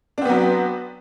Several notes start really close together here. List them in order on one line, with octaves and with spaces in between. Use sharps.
D4 C4 B3 F#3